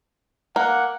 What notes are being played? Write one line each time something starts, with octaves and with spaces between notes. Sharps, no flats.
A#3 F#5